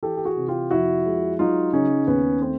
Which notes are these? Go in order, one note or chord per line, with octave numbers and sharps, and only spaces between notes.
E3 G4 A4
G4
F#4 G#4
C3
F4 G4
F2 E4 F#4
G#3
F#3 D#4 F4
C#3 C#4 D#4
D#2 B3 C#4
A3 C4